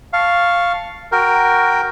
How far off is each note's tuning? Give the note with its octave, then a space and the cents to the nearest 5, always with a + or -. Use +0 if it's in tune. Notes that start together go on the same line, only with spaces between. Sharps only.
F5 +0 A5 +0 C#6 +0
F#4 +0 A#4 +0 G5 +0